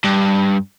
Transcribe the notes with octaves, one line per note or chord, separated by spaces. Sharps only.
G2